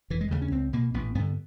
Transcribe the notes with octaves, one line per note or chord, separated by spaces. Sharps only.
F1 E3
G#3
D#2 C#3 A3
C#4
C#2 C4
B2 A#3
A1 B3
G2 D3 B3